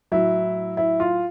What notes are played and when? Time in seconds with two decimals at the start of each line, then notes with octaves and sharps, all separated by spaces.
0.12 A2 F#3 E4
0.77 E4
1.00 F4